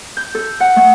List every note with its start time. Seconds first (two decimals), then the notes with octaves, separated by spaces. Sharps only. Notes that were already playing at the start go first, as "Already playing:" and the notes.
0.17 G6
0.35 A4
0.60 F#5
0.76 A3